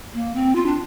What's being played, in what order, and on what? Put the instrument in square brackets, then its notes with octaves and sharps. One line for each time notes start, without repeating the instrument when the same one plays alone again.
[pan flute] A#3
C4
F4
D4